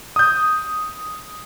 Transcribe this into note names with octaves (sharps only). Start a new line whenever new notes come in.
D#6 G6